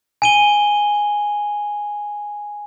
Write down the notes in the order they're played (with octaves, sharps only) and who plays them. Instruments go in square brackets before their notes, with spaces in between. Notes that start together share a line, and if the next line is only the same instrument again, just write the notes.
[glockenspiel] G#5 D#7 G7